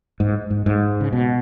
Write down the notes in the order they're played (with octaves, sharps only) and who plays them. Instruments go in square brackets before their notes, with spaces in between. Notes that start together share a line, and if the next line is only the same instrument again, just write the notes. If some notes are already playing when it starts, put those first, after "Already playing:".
[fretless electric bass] G#2
G#2
G#2
C#3
B2